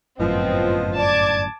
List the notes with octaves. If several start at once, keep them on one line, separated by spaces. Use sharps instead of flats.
G1 F#2 A2 F3 B3 C4 D#5
D5 A5 D6 G#6